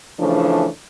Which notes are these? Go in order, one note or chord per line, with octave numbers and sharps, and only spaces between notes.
C#3 E3 F3 A3 D4